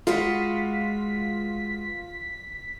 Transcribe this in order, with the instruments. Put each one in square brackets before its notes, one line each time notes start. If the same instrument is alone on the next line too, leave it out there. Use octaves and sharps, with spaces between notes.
[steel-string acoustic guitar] G#3 F#4 B4 [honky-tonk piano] F4 [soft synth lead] B6